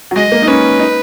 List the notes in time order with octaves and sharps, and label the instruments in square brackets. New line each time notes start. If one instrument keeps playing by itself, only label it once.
[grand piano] F#3
[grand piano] G#3 [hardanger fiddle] D#5
[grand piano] A#3
D#4
[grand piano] C#4 [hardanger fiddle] B4
[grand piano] D#4